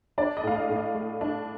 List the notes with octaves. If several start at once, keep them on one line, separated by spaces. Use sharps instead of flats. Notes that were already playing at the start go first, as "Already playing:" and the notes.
D4 D5
D#5
A2 F5
D#5
A2
D#5
A3
D4